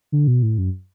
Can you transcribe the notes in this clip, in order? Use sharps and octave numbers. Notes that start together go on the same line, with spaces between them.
D3
B2
A2
F#2